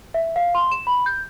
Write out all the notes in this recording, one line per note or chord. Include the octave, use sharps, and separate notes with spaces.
E5
F5
C6
E7
B5
G6